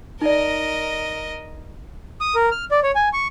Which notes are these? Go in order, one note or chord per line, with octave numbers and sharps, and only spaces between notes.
D#4 A#4 D5 D#5
D#6
A#4
F6
D5
C#5
G#5
C#6